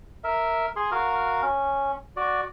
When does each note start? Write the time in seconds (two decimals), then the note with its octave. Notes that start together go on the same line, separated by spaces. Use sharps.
0.24 A#4 E5
0.76 G#4 C6
0.91 F#4 A#4 F5
1.43 C#4
2.17 F#4 D5